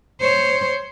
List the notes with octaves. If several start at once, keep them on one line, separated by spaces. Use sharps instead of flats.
C5 C#5